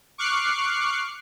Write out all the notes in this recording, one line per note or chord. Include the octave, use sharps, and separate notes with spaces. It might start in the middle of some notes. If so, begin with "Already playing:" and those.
C#6 D6 F6 F#6 C7